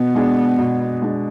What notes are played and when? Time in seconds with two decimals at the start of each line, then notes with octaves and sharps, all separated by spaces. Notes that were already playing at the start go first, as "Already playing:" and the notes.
Already playing: B2 B3
0.15 G#3 D4 G#4
0.58 B2
1.02 G#3 D4 G#4